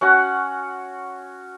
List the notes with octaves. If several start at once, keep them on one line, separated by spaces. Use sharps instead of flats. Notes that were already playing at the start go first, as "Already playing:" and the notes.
C#4 F#4 F#5